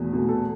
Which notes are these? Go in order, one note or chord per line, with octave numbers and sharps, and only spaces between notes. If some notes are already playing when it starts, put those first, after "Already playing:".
Already playing: E2 B2 A3
B2 A3
A4